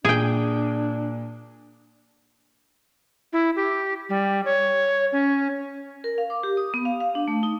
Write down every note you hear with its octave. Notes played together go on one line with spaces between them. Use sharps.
A#2 D4 G#4 G5
E4
G4
G3
C#5
C#4
A#4
F5
D6
G4
D#6
B3
F5
F5
D4
A3
D#4